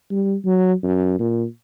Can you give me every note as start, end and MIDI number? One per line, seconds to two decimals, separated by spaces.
0.10 0.35 55
0.45 0.73 54
0.83 1.15 42
1.19 1.45 46